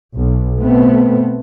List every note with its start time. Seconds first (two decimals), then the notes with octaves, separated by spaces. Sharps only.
0.15 B1 B2
0.61 B2 A3 B3 C4